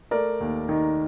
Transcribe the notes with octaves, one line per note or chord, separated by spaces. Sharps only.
A3 A#4 D5
D#2
D#3